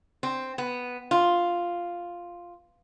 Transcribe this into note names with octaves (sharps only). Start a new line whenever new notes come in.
C4
B3
F4